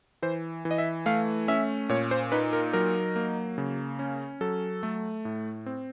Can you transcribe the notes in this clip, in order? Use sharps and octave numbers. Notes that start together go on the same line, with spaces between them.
E3 C5
E3
D#5
E5
A3 F5
C#4 E5
A#2 C#5
C5
D#4 B4
A#4
F#3 A#4
A#3
C#3
C#4
F#3 A4
A3
A2
C4